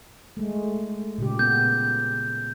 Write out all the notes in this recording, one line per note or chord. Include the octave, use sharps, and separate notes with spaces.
G#3 A3
A#2 C#3 G4
B3 G6